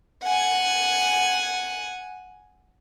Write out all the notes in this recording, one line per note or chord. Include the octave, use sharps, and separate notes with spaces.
F#5 G#5